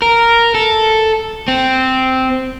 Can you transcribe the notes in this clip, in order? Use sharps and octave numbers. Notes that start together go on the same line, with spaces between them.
A#4
A4
C4